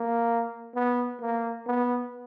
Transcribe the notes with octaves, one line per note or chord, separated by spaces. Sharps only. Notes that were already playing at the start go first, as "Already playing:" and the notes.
Already playing: A#3
B3
A#3
B3